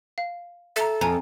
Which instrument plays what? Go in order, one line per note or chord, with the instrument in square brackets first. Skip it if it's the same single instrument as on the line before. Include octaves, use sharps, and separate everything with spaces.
[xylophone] F5
[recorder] A4 [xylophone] E5 A#5
[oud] F2 [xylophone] G#5 A#5